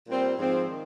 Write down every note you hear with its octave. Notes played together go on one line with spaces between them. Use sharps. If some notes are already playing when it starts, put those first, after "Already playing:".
A#2 G3 C4
G#2 F3 C4
D#3